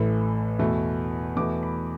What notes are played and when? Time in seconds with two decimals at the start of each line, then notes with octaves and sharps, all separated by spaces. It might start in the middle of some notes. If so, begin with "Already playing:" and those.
Already playing: A1 A2 E3 A3
0.59 E2 B2 A3
1.36 E2 B2 A3 D6
1.63 B5